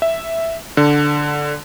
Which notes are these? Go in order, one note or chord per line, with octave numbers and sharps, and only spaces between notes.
E5
D3